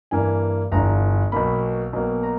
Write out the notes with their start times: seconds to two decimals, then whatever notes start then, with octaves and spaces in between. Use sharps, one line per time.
0.11 G2 E3 A#3 G#5
0.72 G1 G2 E3 A#5
1.32 B1 B2 A#3 B5
1.93 B1 B2 A#3
2.23 A#5